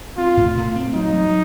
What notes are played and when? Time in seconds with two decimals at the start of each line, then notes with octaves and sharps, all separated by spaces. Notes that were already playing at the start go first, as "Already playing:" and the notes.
0.18 C4 F4
0.37 A2
0.57 A2
0.76 C4
0.94 F#3 D#4
1.14 F#3